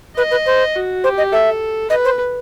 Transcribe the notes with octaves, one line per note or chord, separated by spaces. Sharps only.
B4 D#5
B4
C5
F#4
G4 C5
D#5
A4 E5
B4 D#5
C5